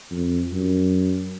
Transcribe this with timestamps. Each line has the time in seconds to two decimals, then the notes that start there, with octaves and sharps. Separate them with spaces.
0.11 F2
0.52 F#2